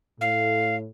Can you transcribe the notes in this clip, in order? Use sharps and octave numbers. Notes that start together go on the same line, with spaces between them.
A2 F5